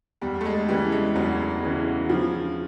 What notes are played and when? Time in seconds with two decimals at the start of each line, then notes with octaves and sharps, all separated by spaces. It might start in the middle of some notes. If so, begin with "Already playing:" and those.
0.21 E2 G3
0.41 A3
0.45 G#3
0.69 C#3 E3 G3
0.92 G#3
1.15 E2 F#3
1.63 C#3 E3
2.09 C#3 F3